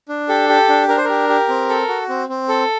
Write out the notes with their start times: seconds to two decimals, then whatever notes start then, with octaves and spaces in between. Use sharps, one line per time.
0.09 D4
0.29 G4 A4
0.49 G4
0.69 D4
0.88 D4 A#4
0.97 C5
1.04 G4 A#4
1.29 G4
1.49 C4
1.69 A4
1.89 F#4
2.09 C4
2.29 C4
2.49 A4